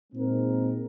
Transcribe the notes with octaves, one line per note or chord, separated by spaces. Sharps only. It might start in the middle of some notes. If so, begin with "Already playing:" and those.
A#2 G#3 C4 D#4 A#4